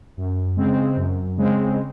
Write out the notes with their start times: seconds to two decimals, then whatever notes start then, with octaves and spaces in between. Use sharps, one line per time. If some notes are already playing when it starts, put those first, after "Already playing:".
0.17 F#2
0.57 C#3 G#3 C4
0.97 F#2
1.37 C#3 G#3 C4